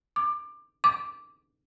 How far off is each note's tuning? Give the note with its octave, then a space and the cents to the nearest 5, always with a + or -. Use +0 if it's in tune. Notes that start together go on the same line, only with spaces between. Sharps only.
D6 +25
D6 -5